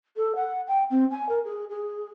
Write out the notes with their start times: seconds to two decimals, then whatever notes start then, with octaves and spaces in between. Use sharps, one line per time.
0.17 A4
0.35 F#5
0.67 G5
0.91 C4
1.11 G#5
1.29 A#4
1.45 G#4
1.70 G#4